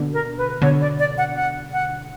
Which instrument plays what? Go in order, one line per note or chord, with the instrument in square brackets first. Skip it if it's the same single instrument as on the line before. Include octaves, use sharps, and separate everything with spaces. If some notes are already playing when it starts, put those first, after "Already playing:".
Already playing: [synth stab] B2 D3
[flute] A#4
B4
[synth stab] B2 D3 [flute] C#5
[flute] D5
D5
F#5
F#5
F#5